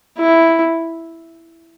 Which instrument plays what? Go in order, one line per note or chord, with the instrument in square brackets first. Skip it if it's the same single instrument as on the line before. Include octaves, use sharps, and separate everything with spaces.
[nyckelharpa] E4